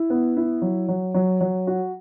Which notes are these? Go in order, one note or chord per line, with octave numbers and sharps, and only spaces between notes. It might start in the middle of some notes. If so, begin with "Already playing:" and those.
Already playing: E4
B3
E4
F#3
F#3
F#3
F#3
F#4